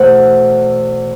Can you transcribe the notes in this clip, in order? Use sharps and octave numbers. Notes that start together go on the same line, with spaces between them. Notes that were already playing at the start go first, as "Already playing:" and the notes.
Already playing: E2 B2 A3 C5 E5 F#5